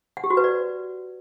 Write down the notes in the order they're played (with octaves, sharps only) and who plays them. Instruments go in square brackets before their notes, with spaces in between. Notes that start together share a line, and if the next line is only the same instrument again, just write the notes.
[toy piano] F#5
G4
F#4
B4
D5